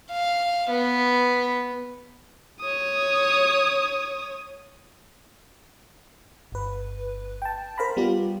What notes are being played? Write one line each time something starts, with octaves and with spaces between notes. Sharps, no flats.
F5
B3
C#5 D#6
G1 B4
G5 A5
A#4 C5 F5 A#5 B5
G3 B3 F4 G4